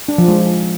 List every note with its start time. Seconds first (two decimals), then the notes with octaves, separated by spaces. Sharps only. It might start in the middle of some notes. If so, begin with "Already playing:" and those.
0.08 D4
0.18 F3
0.28 G#3